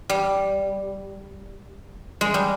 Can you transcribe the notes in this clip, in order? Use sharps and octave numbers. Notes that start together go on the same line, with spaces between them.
G3
G#3
G3